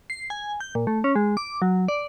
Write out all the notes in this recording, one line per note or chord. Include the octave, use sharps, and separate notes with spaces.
C7
G#5
G6
A#2
A3
C#4
G#3
D6
F#3
D5